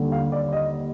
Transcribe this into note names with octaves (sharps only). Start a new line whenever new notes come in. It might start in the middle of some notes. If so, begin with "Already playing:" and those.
Already playing: D#2 D3 G3
F5
D5
D#5